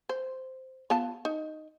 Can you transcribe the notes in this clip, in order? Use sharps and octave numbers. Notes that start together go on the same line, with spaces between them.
C5
B3 F4 A5
D#4